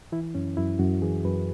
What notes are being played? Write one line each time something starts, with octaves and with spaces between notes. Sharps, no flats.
E3 E4
F#2 C#4
F#2 E4
F#2 F#4
E3 G#4
F#2 B4